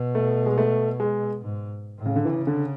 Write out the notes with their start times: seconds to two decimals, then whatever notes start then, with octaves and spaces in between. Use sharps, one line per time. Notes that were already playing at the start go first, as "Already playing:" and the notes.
Already playing: B2
0.15 A3
0.46 G#3
0.58 A3
1.00 G#3
1.42 G#2
1.97 A2
2.06 C#3
2.16 D3
2.25 C#3 E3
2.47 D3